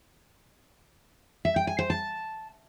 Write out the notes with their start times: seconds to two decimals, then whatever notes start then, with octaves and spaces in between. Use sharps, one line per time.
1.45 E5
1.56 G5
1.67 G#5
1.79 C5
1.90 A5